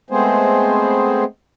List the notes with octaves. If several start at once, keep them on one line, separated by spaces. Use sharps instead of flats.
G#3 A3 B3 C4 G#4 C5